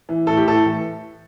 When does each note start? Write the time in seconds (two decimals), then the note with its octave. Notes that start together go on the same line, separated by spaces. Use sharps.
0.09 E3
0.26 A2 A4
0.37 G4
0.45 A2 A4
0.63 E3